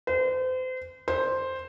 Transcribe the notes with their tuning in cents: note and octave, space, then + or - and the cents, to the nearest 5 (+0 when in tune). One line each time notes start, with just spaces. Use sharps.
C5 -35
C5 +5